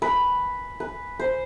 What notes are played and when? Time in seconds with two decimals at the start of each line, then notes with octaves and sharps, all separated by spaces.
0.02 B4
0.80 B4
1.19 C5